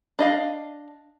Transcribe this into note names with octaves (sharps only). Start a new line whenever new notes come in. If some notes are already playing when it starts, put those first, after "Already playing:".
D4 D#5 F5